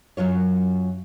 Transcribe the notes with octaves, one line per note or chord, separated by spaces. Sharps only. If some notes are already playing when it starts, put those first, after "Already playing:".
F#2 F#3 F4 C#5